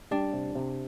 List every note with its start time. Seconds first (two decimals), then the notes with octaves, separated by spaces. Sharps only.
0.11 G3 D4
0.33 C3
0.55 C3